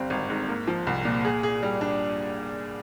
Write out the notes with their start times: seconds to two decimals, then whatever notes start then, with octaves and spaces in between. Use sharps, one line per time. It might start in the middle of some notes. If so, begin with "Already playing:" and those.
Already playing: G1 G3 C4
0.10 G#1
0.30 G#2
0.49 A#3
0.67 F3
0.87 C2
1.05 A#2
1.25 G#4
1.43 G#4
1.63 G3
1.81 D4